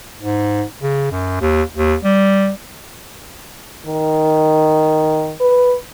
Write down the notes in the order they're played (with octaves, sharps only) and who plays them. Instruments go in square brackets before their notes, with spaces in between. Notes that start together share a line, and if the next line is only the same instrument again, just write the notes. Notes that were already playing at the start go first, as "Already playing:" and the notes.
[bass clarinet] G#2
C#3
F#2
D#2
D#2
G3
[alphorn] D#3
B4